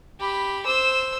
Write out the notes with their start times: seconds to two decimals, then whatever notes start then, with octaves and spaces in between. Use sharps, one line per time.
0.20 G4 B5
0.66 C5 E6